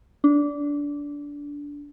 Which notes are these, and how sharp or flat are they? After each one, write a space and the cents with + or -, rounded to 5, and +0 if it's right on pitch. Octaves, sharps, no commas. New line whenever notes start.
D4 -20